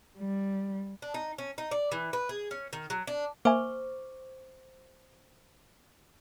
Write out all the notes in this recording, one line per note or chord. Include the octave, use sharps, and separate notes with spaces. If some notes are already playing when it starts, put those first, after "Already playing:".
G3
D4
D#4
C#4
D#4
D5
E3
B4
G#4
C#4
D#3
F#3
D4
A#3 C5 E5 G#5 C#6 D6